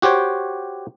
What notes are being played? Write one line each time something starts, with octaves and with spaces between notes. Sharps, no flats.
F#4 G4 C5 C#5 G5